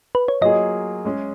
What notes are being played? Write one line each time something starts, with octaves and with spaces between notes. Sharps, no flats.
B4
C#5
F#3 A#3 F4 G#4 D#5
G#3 C#4 G#4